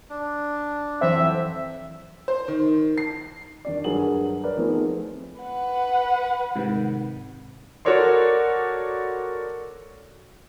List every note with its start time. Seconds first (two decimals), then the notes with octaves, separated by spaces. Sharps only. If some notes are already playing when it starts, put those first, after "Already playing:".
0.10 D4
1.01 F2 E3 F#3 C4 E5
2.28 C5
2.48 D#3
2.98 C7
3.65 D#2 D4 D5
3.84 G2 F#3 G#4 A#4 C#5 F#7
4.43 A#4 B4 C#5 D5
4.57 D#3 F3 A3 B3 C4 G#4
5.40 B4 F#5
6.55 G#2 C3 D#3
7.85 F#4 A4 A#4 C#5 D5 C6